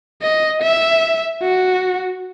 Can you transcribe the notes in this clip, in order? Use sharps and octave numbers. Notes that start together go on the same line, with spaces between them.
D#5
E5
F#4